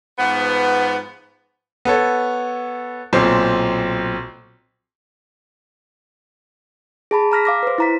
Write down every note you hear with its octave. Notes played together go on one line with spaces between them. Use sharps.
G#2 F3 B3
B3 A4 C#5
B1 A#2 C4
G#4 A5 B5
A#5 F6 A#6 B6
F5 D6 A#6
B4 C5
E4 A#5 B6